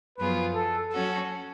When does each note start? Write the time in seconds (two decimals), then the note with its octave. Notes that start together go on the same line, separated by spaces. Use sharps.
0.18 F#2 F3 B3 F4 G#4 B4
0.55 A4
0.92 F#3 C#4 F#4 A4